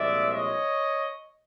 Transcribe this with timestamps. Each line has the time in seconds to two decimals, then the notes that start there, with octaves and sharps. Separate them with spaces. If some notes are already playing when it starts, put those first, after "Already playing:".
Already playing: C2 A#2 F3 G#3 D5 E5
0.32 C#5 D#5